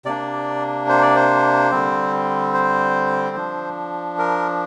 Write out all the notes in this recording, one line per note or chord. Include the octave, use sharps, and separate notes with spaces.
C3 A#3 D4 D5
C5
D5
C5
D3 G3 C4
C5
F3 D4
A#4